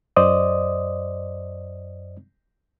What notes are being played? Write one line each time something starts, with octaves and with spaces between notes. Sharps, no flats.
F#2 C5 D5 D#5 D#6